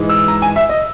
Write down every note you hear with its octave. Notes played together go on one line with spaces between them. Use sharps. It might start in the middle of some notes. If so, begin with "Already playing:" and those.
Already playing: G#2 E3 G#3
E6
A#5
G#5
E5
D#5